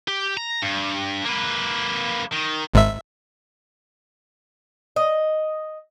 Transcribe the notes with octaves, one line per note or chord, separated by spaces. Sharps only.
G4
A#5
G2
A#3 B4
D#3
G#1 G#2 E5
D#5